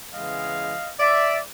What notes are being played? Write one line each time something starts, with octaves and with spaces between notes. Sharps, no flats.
C#3 E3 G#3 B3 D#5 F5
D5 E5